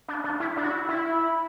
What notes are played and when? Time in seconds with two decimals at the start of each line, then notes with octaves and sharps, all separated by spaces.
0.08 D4
0.24 D4
0.40 E4
0.57 D4
0.64 F#4
0.72 E4
0.89 E4